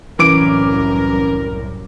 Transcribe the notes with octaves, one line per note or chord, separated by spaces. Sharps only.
C2 F#2 A2 E3 C#4 A#4 D6 D7